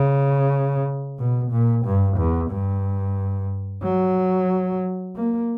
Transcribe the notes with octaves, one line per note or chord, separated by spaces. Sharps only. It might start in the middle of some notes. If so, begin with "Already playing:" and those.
Already playing: C#3
B2
A#2
G2
E2
G2
F#3
A#3